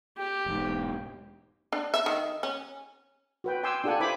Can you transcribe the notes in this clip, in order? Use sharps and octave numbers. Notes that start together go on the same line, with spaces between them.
G4
E1 G#2
D4
E5
D#3
C#4
F#4 B4 G5
G5 G#5 C6 D6 E6
D4 F4 G4 A4 F#5 G#5
E4 C5 G#5 B5 D6